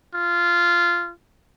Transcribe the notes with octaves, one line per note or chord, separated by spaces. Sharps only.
F4